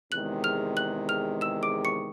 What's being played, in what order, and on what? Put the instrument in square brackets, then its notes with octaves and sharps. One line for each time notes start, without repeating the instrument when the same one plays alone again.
[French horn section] E2 C3 D#3 G#3 [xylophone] F#6 F#7
[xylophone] F6 F7
F#6 F#7
F6 F7
E6 E7
D6 D7
C#6 C#7